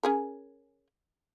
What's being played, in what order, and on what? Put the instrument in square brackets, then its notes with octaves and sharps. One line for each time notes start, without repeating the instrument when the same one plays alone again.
[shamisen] C#4 G#4 A#4